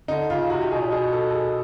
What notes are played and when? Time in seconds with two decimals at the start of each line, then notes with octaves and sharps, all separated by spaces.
0.08 D3 D#4
0.30 C#3 F4
0.50 C3 F#4
0.61 G4
0.71 B2 G#4
0.81 A#2
0.89 B2 G#4
1.13 A4
1.30 A4
1.34 G#4